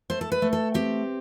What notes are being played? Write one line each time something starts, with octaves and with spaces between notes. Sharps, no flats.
A3 C5
A4
B4
A3
A4
C4 G4